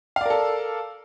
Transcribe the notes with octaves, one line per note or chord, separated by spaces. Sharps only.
A4 A#4 D5 F5